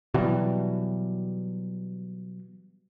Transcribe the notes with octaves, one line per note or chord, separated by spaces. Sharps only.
B2 E3 F#3 G3